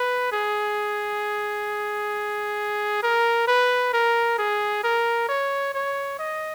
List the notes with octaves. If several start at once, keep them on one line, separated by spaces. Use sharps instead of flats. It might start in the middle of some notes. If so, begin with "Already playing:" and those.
Already playing: B4
G#4
A#4
B4
A#4
G#4
A#4
C#5
C#5
D#5